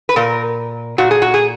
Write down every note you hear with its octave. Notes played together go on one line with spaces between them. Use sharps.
B4
A#2 A#4
A#2 F#4
G#4
F#4
G#4